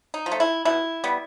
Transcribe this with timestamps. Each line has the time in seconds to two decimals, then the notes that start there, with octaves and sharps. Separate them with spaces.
0.14 D#4
0.26 F3
0.32 A3
0.40 E4
0.65 B2 E4
1.04 G3 B3